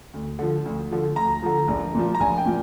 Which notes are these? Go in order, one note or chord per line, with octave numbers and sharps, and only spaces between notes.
D2
D3 F3
D2
D3 F3
D2 A#5
D3 F3
A#1
A#2 F3
A#5
A#1 G#5
G5
A#2 F3